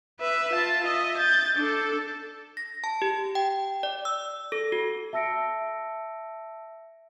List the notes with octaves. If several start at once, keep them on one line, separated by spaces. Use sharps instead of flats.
B4 E5
F4 A5
D#5 E5
G6 A6
D4 A4
A#6
A5
G4
G5
D5
E6
A4
F#4
E5 A5 E6 A#6 C#7 D7